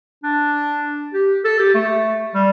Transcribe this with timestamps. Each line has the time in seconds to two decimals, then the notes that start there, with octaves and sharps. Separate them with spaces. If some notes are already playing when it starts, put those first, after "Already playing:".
0.23 D4
1.14 G4
1.45 A4
1.59 G4
1.74 A3
2.35 G3